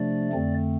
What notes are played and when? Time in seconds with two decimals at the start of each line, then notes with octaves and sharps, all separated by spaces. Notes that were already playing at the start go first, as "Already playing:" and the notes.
Already playing: C3 F3 A3 D4 D5
0.33 F2 D3 A3 C4